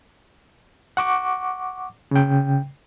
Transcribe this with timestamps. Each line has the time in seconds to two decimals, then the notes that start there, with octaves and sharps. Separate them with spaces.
0.97 F#5 C#6 D6
2.11 C#3 G5